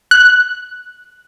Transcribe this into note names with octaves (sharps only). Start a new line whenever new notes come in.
F#6